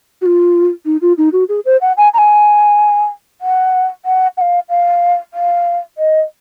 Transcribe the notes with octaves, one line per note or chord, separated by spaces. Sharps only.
F#4
F4
D#4
F4
D#4
F#4
G#4
C5
F#5
G#5
A#5
G#5
F#5
F#5
F#5
F5
F5
F5
D#5